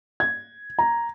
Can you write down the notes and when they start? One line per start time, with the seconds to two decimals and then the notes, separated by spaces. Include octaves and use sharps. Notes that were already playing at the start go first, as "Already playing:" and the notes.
0.20 G#6
0.79 A#5